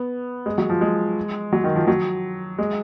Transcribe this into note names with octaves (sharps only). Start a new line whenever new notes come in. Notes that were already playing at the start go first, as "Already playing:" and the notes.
Already playing: B3
G#3
F#3
F3
G#3
F#3
D#3
F3
F#3
G#3